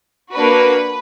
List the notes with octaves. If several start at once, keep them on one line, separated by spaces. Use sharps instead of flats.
A#3 D4 F#4 B4